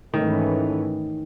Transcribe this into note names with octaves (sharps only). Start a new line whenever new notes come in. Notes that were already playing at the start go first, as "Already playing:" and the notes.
G#2 D#3 E3 A3 C#4